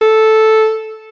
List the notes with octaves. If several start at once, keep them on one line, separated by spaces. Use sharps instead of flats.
A4